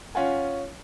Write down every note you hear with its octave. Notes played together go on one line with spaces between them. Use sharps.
C#4 F4 F#5 G#5